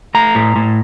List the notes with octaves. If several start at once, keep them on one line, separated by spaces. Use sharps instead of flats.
A3 A#5
A2
A2